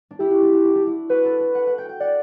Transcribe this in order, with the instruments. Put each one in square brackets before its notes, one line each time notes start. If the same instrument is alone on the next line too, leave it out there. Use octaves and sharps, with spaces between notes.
[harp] D4
[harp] E4 [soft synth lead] G4
[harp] F#4
D4
F#4
E4
D4
E4
[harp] F#4 [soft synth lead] B4
[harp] A4
A4
F#5
F#5
G5
G5
[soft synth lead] D5 [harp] F#5